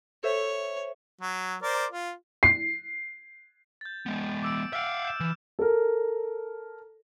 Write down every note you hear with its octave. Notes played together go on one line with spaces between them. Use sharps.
A4 C5 C#5 E5
F#3
A#4 C5 D5
F4
C7
G6 A6
G#3 B3
D6 E6 D7
E5 F5 E6 F6 D7
G6 E7
E3
A4 A#4